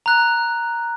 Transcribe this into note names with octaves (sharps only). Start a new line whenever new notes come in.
A#5 F#6